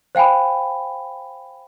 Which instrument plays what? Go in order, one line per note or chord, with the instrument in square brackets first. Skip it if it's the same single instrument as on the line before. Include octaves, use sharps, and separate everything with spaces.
[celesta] C5 F5 G5 G#5 B5